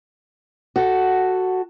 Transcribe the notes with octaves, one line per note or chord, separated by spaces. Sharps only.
F#4 A4